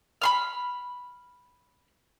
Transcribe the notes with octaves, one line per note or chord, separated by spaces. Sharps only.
B5 C6 F6